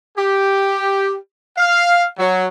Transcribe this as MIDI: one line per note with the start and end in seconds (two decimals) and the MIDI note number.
0.18 1.15 67
1.58 2.05 77
2.18 2.47 54